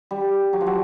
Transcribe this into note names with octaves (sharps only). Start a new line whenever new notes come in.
G3
F#3
F3
F#3